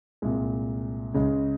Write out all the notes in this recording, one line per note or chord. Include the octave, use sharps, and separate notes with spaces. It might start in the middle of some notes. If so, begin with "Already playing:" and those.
C2 A#2 G#3
C#2 C#3 G#3